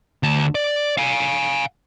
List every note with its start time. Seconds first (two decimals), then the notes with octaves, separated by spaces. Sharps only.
0.23 D2 A5
0.55 D5
0.98 F5 G#5